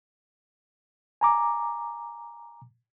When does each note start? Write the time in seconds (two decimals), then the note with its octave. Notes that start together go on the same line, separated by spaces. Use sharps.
1.21 G#5 A#5 D6